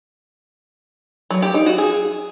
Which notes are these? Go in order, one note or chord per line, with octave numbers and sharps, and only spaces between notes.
F#3
G4
D#4
F#4
G#4